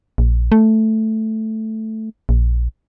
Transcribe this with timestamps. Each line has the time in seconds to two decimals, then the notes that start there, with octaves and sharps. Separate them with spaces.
0.18 A#1
0.52 A3
2.29 A#1